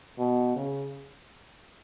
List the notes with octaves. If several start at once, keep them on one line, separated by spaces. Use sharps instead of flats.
B2
C#3